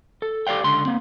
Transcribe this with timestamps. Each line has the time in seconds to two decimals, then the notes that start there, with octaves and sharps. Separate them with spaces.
0.22 A4
0.47 G4 A4 D5 F5 G5
0.64 C#2 D3 C6
0.85 A#3 C4